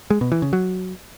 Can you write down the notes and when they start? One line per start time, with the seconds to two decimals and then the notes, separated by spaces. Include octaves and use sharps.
0.10 G#3
0.21 B2
0.32 E3
0.42 C#3
0.53 F#3